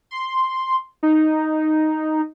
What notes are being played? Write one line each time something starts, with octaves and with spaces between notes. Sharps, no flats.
C6
D#4